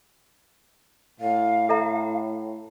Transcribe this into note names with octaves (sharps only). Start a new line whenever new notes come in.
A2 F5
A4 E5 A#5